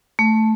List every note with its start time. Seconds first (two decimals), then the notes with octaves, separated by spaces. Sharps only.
0.19 A3